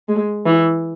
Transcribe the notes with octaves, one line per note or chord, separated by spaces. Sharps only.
G#3
E3